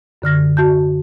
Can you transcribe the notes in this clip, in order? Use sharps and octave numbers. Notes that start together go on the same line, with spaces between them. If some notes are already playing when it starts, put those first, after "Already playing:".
F#2 D3 F6 A#6
F#4 A5 G6